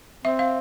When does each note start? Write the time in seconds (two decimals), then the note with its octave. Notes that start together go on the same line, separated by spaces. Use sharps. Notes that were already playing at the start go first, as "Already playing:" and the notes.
0.24 C4 E5
0.39 F5